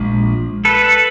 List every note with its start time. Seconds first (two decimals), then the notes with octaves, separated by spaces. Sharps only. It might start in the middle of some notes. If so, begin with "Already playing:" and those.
Already playing: A#1 A#2 F3 G#3
0.65 A4 B4